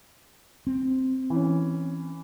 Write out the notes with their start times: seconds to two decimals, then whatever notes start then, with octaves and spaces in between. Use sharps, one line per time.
0.67 C4
1.30 E3 C#4